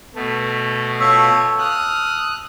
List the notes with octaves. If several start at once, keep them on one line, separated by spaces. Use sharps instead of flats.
B2 A3
F4 C#5 A5 E6
D#6 F6 F#6